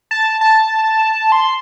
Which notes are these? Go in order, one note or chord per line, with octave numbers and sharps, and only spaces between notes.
A5
A5
C6